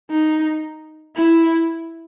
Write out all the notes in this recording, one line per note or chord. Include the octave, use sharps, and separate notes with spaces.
D#4
E4